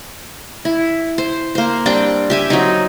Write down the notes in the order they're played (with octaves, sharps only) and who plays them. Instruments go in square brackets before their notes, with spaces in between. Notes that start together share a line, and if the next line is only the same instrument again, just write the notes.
[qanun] E4
C5
A#3 C5
G3 C4 D4 G5
G4 E5 G#5
F#3 C4 D#4